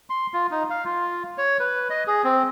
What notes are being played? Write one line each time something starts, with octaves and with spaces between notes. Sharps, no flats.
C6
F4
D#4
F5
F4
C#5
B4
D#5
G#4
C4